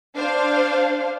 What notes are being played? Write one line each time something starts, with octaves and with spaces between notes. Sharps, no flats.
D4 C5 F5